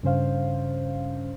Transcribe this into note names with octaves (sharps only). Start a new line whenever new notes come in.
G2 C#3 C#4 C5 F5